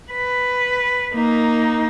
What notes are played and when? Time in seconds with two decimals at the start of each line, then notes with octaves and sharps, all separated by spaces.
0.11 B4
1.14 A#3 D#4